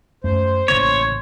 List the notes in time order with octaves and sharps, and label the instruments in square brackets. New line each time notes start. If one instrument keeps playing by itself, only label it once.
[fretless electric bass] F#2 A3 [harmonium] C5
[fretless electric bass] A1 C#3 A#3 [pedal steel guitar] C#5